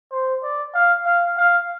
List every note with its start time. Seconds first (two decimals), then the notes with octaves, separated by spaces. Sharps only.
0.12 C5
0.43 D5
0.74 F5
1.06 F5
1.37 F5